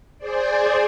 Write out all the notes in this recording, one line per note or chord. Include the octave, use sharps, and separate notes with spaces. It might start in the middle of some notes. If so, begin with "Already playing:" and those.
G#4 C5 D5